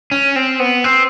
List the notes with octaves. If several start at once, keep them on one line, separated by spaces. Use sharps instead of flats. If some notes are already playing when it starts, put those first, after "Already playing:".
C#4
C4
B3
C4